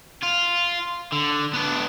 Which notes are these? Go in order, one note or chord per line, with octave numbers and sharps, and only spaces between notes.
F4
D3
B3 D4